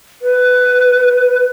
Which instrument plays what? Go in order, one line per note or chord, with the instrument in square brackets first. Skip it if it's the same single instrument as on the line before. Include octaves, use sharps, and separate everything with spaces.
[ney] B4